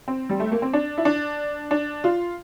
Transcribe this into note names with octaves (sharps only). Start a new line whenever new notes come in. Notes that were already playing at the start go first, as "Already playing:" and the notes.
C4
G3
A3
A#3
C4
D4
E4
D4
D4
F4